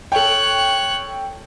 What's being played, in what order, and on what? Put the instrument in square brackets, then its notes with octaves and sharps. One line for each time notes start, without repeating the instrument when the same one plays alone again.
[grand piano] A4 G5 [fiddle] C#5 F#6